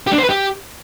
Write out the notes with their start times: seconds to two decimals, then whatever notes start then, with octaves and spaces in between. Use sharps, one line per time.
0.07 G4
0.12 D4
0.18 C5
0.24 B4
0.29 G4